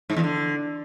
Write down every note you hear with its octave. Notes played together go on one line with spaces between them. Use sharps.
G#2
E2
D3